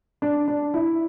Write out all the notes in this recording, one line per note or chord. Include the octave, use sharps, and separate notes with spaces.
D4
D4
E4